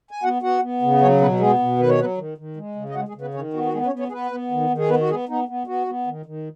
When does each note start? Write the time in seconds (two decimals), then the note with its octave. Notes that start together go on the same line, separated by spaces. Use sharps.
0.11 G#5
0.23 B3 F#4 F#5
0.42 B3 F#4 F#5
0.62 B3
0.82 C#3
1.01 F#3 C#4 C#5
1.21 B2 B3 B4
1.40 G#3 B3 G#4
1.59 B2
1.78 D#3 B4
1.89 C#5
1.98 F#3 B3 B4
2.18 D#3
2.38 D#3
2.56 G#3
2.75 C#3
2.89 D#5
2.95 G#3 F#4 F#5
3.08 G#3 G#4
3.15 C#3
3.21 B3 B4
3.34 D#3 C#4 C#5
3.53 B3 F#4
3.65 F#4
3.73 G#3 B3 G#4
3.81 B4
3.86 C#4 C#5
3.92 B3
3.99 C#4 C#5
4.08 G#4
4.12 B3 B4
4.31 B3
4.51 D#3
4.70 D#3
4.78 G#4
4.89 B3 B4
5.00 F#4
5.09 G#3 B3 G#4
5.29 B3 D#4
5.48 B3
5.67 B3 F#4
5.87 B3
6.07 D#3
6.26 D#3